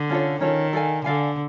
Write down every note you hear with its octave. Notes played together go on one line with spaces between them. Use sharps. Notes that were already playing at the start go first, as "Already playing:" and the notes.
Already playing: D3
C#4 F4 A4 C#5
D#3 C#4 F4 A4 C#5
A4 D5 F5 G#5
D3 A4 D5 F5 G#5